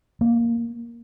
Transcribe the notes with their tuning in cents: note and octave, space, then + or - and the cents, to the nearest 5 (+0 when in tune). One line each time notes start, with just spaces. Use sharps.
A#3 +0